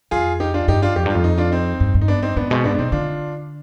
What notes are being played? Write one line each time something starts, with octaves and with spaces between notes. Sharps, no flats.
F2 F4 G#4
D#4 G4
D4 F4
G2 D#4 G4
D4 F4
F2 G4
G2
F2 F4
D#4
D4 F4
C4 D#4
G2
G2
D#4
B3 D4
C4 D#4
G#2 B3 D4
B2 G#3 C4
G#2 B3 D4
D4
B2 C4 D#4
D3 D4 F4